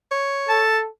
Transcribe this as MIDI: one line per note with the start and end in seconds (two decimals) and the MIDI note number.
0.11 0.63 73
0.49 0.89 69
0.49 0.79 81